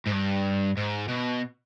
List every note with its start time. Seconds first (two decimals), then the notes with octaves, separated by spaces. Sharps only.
0.07 G#2
0.12 G2
0.77 G#2
1.09 B2